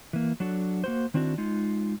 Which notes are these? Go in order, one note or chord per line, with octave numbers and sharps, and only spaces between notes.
E3 A#3
F#3 D4 F#4 A4
A#3 F#4 C5
D#3 C4 D4 E4 F#4
G#3 D#4 F4